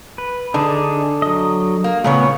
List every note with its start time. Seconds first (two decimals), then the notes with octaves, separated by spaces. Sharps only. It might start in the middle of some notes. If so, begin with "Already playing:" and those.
0.18 B4
0.54 D3 D4 D#4 G#4
1.22 F#3 D#5
1.84 A#3
2.04 A#2 C#3 A3 B3 C#5